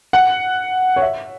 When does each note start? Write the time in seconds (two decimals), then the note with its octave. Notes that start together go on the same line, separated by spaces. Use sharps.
0.13 F#5
0.96 C#5
1.02 E5